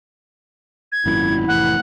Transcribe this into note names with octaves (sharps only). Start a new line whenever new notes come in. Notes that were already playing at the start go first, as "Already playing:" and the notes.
G#6
G#1 F#2 A#2 E4
F1 A2 E3 F#5